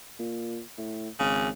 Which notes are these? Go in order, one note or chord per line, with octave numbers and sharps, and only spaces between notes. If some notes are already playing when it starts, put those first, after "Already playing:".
A#2
A2
G#1 C#3